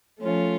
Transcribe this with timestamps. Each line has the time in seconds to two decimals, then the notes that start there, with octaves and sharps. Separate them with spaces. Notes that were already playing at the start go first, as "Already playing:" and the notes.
0.21 F3 A3 C#4 F4